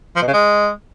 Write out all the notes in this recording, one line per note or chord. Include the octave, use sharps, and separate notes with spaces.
F3
B2
C#3
G#3